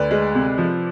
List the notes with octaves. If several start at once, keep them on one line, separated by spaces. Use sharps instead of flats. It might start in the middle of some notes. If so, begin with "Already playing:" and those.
Already playing: D2 B4 D5
G#3
C3
F3